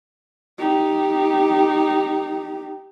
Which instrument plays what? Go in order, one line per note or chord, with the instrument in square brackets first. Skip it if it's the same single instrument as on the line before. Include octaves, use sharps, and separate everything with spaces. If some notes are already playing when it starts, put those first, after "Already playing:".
[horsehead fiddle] D#4 G4